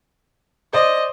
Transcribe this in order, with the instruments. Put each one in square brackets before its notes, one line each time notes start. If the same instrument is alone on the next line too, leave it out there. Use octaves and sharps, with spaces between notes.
[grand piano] C5 D5 [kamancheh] D#5